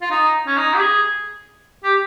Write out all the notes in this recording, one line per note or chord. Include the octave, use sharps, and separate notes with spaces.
F4
D#4
C#4
D#4
G4
G#4
G4